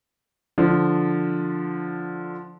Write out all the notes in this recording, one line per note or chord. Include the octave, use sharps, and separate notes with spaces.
D3 F3